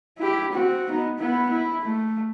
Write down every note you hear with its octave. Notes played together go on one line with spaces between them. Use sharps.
E4 G4
C4 F#4
B3 D#4
B3 E4
E4
A3